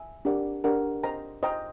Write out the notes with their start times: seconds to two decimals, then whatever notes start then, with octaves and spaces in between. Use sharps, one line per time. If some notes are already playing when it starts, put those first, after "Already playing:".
Already playing: E5 G#5
0.25 D4 G4 A#4 D5 F#5
0.64 D4 G4 A#4 D5 F#5
1.03 C5 D#5 G5 A#5
1.43 C5 D#5 G5 A#5